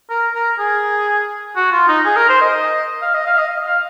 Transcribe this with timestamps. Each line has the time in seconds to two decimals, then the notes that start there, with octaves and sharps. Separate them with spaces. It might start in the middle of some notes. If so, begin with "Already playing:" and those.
0.10 A#4
0.35 A#4
0.59 G#4
1.56 F#4
1.72 F4
1.88 D#4
2.05 G#4
2.16 A#4
2.29 C5
2.41 D#5
3.02 F5
3.14 D#5
3.27 F5
3.38 D#5
3.67 F5